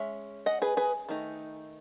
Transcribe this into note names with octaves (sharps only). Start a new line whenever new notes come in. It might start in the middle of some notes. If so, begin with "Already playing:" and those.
Already playing: G#3 C#4 E5
D#5 F#5
G#4 B4
G#4 B4
D#3 A3 D#4